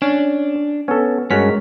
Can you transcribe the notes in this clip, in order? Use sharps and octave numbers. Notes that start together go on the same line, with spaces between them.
C#4 D4
B3 C#4 A4
G2 G#3 C#4 F#4 A#4 B6